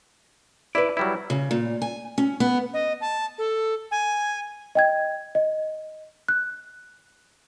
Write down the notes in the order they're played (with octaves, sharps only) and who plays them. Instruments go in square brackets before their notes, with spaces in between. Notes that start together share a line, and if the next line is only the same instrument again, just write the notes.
[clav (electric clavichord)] E4 [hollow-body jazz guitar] B4 D5
[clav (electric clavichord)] F#3 G3 E4
[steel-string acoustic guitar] C#3
A#2
G#5
C#4
B3
[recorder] D#5
A5
A4
G#5
[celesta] D#5 G5 G#6
D#5
F#6